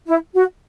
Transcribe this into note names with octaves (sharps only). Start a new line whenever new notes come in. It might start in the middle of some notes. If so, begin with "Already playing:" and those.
E4
F#4